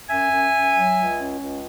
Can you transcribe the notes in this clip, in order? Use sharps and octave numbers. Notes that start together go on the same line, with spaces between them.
F#2 E5 G#5
F#2
F#2
F#3
C#2
C#4
C#2